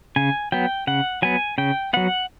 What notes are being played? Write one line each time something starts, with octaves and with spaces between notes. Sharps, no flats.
C#3 G#5
F#3 B3 G5
C#3 F#5
F#3 B3 G#5
C#3 G5
F#3 B3 F#5